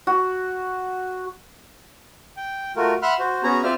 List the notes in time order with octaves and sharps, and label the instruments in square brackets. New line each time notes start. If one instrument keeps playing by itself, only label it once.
[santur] F#4
[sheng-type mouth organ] G5
A3 F4 F#4 A#4
E5 F#5 B5 C6 F6 F#6
F#4 C5
B3 C#4 F#4 G#4 A#5
C4 F4 C5 D5 E5 F6